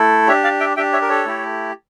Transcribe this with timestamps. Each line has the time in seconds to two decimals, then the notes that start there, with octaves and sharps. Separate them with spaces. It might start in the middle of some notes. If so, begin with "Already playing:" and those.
Already playing: A3 E4 A4
0.27 D4 G4 C#5 E5
0.44 D5 F5
0.60 E5 G5
0.77 D4 G4 E5 G5
0.93 C#5 E5
1.02 A#4
1.09 A4 C#5
1.25 A3 E4 G4